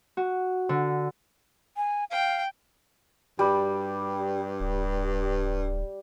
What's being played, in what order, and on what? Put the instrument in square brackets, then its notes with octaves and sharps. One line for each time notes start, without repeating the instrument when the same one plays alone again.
[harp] F#4
D3
[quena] G#5
[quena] F5 [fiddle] G5
[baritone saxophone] G2 [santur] G3
[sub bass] D1